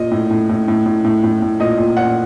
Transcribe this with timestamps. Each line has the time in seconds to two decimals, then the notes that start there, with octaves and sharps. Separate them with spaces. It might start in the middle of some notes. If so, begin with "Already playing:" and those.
Already playing: A#2 D#5
0.11 A2
0.31 A2
0.49 A2
0.68 A2
0.86 A2
1.04 A2
1.23 A2
1.42 A2
1.60 A#2 D#5
1.78 A#2
1.97 A#2 F#5